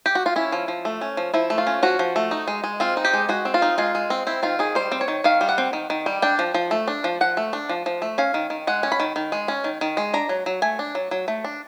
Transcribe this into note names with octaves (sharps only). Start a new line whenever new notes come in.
G4
F#4
F4
C#4 E4
F3
F3
A3
C#4
F3
F3 E4
A3
F4
C#4
F3 F#4
F3
A3
D#4
G#3
G#3
C4 F4
D#4
G4
G#3
G#3 F#4
C4
F4
D#4
G#3 F4
G#3
C4
C4 E4
D#3 F4
D#3 G#4
G3 C5
C4
C#5
D#3
D#3 F5
G3
F#5
C4
D#3
D#3
G3
D4 G5
F3
F3
A3
D4
F3
F3 F#5
A3
D4
F3
F3
A3
C#4 F5
D#3
D#3
G#3 F#5
C#4
B5
D#3
D#3
G#3
C#4
D#3
D#3
G#3
D4 A#5
F#3
F#3
A3 G#5
D4
F#3
F#3
A3
D4